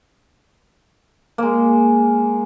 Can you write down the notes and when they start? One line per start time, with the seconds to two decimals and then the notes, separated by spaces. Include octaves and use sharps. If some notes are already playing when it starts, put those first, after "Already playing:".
1.38 G#3 A#3